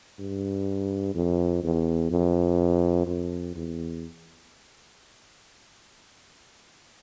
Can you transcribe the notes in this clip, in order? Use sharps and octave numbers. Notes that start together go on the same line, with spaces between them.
G2
F2
E2
F2
F2
E2